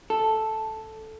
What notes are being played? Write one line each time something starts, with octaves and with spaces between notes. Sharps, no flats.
A4